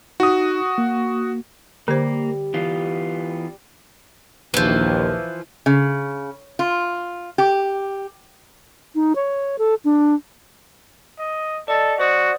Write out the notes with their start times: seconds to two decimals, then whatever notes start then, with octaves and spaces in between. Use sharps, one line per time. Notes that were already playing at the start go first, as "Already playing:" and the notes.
0.20 D#4 F#4 D#6
0.78 A#3
1.88 D3 G3 A#3 C5
2.54 E3 B3 F4
4.54 A#1 D#2 E3 F3
5.66 C#3
6.59 F4
7.38 G4
8.95 D#4
9.15 C#5
9.58 A4
9.84 D4
11.19 D#5
11.68 A4 D5 D#5
12.00 F#4 C5 D5 D#6